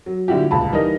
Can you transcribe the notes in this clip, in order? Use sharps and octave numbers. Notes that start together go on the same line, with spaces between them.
F#3
A#2 D3 G3 E4 F#4 G4
D#1 C#2 A5 B5
E3 G3 D#4 A#4 D#5